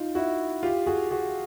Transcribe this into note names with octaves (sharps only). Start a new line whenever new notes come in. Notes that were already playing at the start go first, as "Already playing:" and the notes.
Already playing: D#4 F4
E4 F#4
F4 G4
F#4 G#4
F#4 G#4